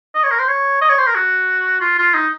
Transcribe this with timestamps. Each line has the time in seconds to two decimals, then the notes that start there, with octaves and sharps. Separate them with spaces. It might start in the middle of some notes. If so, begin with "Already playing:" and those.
0.15 D#5
0.24 C#5
0.31 A#4
0.39 C5
0.48 C#5
0.82 D#5
0.89 C#5
0.98 C5
1.07 A#4
1.15 F#4
1.81 F4
1.98 F4
2.14 D#4